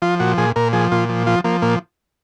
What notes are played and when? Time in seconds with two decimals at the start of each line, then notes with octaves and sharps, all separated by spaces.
0.02 F3 F4
0.20 A#2 F#4
0.38 A#2 G#4
0.56 A#2 A#4
0.73 F3 G#4
0.92 A#2 F4
1.09 F3
1.27 F3 F4
1.44 F3 A#3
1.62 A#2 A#3